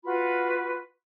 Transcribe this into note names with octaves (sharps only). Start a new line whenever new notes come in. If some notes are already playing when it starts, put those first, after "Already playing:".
F4 F#4 B4 B5